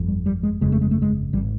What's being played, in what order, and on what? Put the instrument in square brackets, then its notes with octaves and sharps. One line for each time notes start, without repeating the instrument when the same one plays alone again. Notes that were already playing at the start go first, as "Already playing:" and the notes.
Already playing: [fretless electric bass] G1 F2
G3
G3
G#3
G1 F2 C#3 G#3
A3
G#3
A3
G#3
G#1 G3